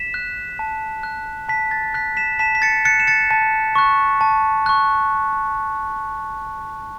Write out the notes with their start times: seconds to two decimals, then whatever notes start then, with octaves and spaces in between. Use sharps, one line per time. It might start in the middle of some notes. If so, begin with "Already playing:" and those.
Already playing: B6 E7
0.14 F#6
0.59 A5
1.03 F#6
1.49 A5 B6
1.71 A6
1.94 F#6 B6
2.17 B6 E7
2.39 A5 B6 E7
2.55 B6
2.62 A6 C#7
2.85 F#6 A6 C#7
3.00 E7
3.07 A6 C#7
3.31 A5 A6
3.75 C#6 F#6
4.21 A5
4.66 C#6 F#6